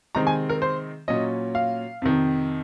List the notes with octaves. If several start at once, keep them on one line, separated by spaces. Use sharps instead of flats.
C3 D#3 G#3 C4 D#4 A#5
G#5
A#4
C5
A#2 F#3 C#4 D#5
F5
F2 C3 D#3